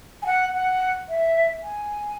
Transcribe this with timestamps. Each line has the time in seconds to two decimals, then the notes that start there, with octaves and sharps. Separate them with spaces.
0.22 G#5
0.26 F#5
0.54 F#5
1.09 E5
1.64 G#5